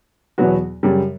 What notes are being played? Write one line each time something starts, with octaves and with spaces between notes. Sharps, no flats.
E2 B2 F#3 B3 F#4
F#2 C#3 G3